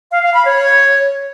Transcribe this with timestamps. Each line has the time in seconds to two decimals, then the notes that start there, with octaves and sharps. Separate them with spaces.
0.12 F5
0.23 F5
0.34 B5
0.45 C#5